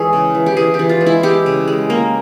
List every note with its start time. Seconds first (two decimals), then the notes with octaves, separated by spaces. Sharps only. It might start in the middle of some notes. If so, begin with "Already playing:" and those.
Already playing: E3 G#3 G#4 C#5 E5
0.13 C#3
0.35 E3
0.46 G4
0.57 E3 G#4
0.74 G4
0.79 E3
0.89 F4
1.01 G#3
1.06 E4
1.23 G#3 G4
1.46 C#3
1.68 G#3
1.90 A#3